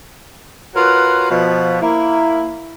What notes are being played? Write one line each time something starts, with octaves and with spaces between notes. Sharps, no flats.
F4 F#4 A#4 B4 C#5
B2 F3
A#3 E4